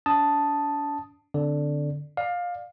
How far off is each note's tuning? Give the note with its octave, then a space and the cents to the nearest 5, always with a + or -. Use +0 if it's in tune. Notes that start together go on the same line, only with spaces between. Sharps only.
D4 -45 A5 +0 D#6 +0
D3 +0 C4 -20 D5 +0
D5 +25 F5 +20